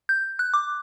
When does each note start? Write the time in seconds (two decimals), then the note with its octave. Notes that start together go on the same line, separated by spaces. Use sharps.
0.09 G6
0.39 F#6
0.54 D6